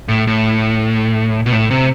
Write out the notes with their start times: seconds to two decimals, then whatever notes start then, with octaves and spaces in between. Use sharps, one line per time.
0.08 A2
0.27 A2
1.46 B2
1.52 A2
1.71 C3